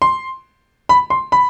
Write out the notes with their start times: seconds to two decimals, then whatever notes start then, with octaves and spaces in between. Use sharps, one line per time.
0.02 C6
0.89 B5
1.10 C6
1.32 B5